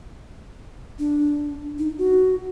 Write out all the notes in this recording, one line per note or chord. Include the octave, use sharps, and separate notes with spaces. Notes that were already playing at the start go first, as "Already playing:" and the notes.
D4
D#4
F#4